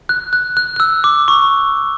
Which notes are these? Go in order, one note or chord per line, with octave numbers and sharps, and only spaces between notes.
F#6
F#6
F#6
F#6
E6
D6
C#6